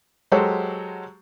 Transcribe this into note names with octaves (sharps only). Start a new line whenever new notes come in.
F#3 G#3 F#4 G4 A4 C5